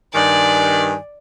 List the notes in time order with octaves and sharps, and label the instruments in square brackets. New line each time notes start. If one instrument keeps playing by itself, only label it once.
[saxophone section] G2 D#3 [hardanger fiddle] D5 [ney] G#5